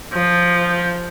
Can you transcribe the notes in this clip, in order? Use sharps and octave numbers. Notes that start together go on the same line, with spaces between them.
F3